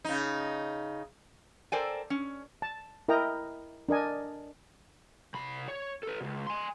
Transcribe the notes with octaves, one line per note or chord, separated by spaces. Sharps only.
C#3 D#4
A4 A#4 C5 D5 G5 G#5
C#4
A5
E4 A#4 D#5 G5 A#5
D4 A#4 D#5 G#5
C3 B5
C#5
A4 B4
C#2 B2
G#5 C6